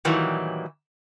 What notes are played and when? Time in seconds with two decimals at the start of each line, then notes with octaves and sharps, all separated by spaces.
0.05 A#2 D#3 E3 F#3 G3